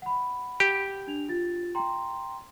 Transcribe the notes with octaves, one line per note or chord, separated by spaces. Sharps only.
F#5 B5
G4
D4 F7
F4 A6
G5 A#5 C6